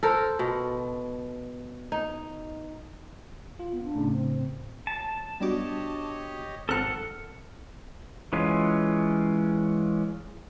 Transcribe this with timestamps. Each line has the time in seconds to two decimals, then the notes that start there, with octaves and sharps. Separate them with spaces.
0.03 A4 A#4 C5
0.39 B2
1.92 D#4
3.59 F4
3.72 B3
3.84 D4
3.95 A2 C#3
4.12 C4
4.87 F#3 A5
5.40 G3 B3 D4 F#4 G4 C#5 D#5 D6
6.69 G#1 C4 A4 A#4 F#5 F#6
8.33 E3 G#3 C#4 F4